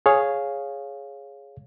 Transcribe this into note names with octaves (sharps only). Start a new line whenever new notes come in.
G#4 C#5 F5